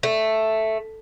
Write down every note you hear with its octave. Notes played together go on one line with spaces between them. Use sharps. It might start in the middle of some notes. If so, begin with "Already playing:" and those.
A3